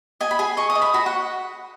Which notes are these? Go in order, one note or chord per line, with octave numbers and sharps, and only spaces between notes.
D#5 G#5
B5
G#4 G#5
D#5 C#6
D#6
D#5
B5
F#4 B5
F#5